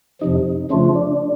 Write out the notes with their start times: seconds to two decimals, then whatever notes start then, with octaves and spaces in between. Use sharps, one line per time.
0.21 F2 C3 F3 D#4
0.70 C#3 F3 A3 C#4 D4 F4
0.95 D4